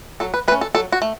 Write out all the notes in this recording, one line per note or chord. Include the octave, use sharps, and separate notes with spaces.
F#3 A4
B4
A3 C#4 B4
A4
F#3 A4
F#4
A3